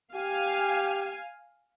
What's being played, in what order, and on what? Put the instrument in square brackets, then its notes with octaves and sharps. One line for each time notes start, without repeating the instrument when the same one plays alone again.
[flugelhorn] G4 [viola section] F5 G#5